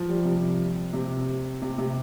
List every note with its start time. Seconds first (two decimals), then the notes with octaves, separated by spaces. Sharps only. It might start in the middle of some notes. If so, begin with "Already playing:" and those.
Already playing: F3
0.09 G3
0.25 C3
0.93 C3
1.62 C3
1.78 C3